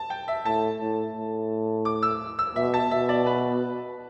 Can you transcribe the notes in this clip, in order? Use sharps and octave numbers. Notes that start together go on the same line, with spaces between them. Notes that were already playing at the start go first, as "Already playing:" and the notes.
Already playing: A5
G5
E5
A2 A5
A2
A2
D6
E6
E6
B2 E5
A5
B2 E5
D5
B4